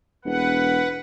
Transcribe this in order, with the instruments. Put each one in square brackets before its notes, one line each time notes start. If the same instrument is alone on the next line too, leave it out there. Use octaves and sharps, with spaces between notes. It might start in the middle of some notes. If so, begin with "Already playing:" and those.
[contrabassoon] E1 [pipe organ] B4 F#5